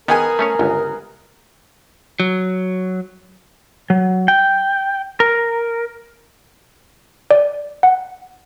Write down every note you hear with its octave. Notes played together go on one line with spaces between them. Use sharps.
D#3 B3 G#4 A#4 G#5
A3 C#4 C#5
G1 C#2
F#3
F#3
G5
A#4
D5
F#5